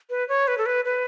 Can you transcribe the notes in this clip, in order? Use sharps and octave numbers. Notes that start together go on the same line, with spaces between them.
B4
C#5
B4
A4
B4
B4